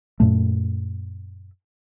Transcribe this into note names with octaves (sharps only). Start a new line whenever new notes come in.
F#2 A#2 A3